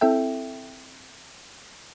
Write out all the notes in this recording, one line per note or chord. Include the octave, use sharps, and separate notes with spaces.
C4 E4 A4 E5 G5